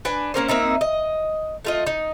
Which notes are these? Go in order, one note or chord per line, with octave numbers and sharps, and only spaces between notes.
D4 B4 G#5
A#3 C#4 A#4 C5
A#3 C4 D#4 E5
D#5
A3 F4 D#5
D#4